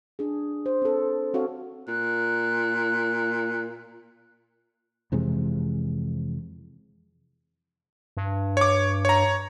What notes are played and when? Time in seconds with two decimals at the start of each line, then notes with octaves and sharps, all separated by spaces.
0.19 D4 G#4
0.66 C5
0.82 C4 A4
1.34 C4 F#4 A4 C#5 F5
1.88 A#2 F#6
5.12 F2 C3 E3 G#3
8.17 G2
8.57 C#5 D6
9.05 C#5 A#5